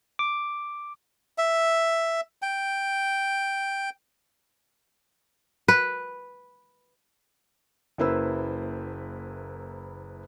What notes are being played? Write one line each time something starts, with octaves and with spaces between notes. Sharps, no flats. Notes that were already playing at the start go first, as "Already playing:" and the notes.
D6
E5
G5
B4
F#1 A#3 E4 B4 C5 E6